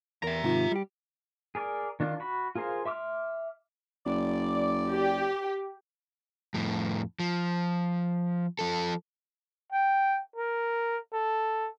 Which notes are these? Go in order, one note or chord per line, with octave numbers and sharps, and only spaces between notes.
E2 A#4 E5 A#5
G#2 C3 D#3 F4
G3 G4
G#4 A#4 D5
D#3 D4 F4
F#4 B5
F4 G#4 A#4 C5 F5
E5 C6 D6 E6 F6
F#1 D5
G4
F2 A2
F3
F3 A4
G5
A#4
A4